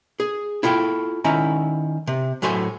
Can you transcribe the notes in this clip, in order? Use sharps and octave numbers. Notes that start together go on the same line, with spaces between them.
G#4
E4 F4 A4 G5
D#3 C#4 E4 A#5
C3
A2 F#3 A3 C5 C#5 G#5